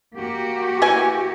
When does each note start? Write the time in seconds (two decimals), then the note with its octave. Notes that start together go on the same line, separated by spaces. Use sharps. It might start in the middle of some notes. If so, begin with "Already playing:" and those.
0.17 A#3 F#4 G4
0.82 E3 G#5